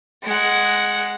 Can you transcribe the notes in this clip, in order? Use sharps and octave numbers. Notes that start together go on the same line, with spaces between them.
G#3 F#5